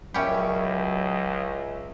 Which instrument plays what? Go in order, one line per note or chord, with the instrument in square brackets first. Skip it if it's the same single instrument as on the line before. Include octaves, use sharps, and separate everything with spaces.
[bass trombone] C#2 [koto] A#2 C#4 G4 [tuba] F#3 [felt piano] E5 G5 B5